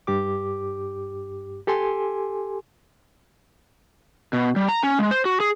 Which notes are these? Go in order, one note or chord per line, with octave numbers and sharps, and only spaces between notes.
G2 G4 D6
G4 A4 G#5 C6
B2
G3
A#5
C#4
G#3
C5
F#4
G#4